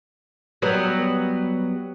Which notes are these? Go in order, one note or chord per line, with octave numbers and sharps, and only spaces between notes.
F#3 G3 B3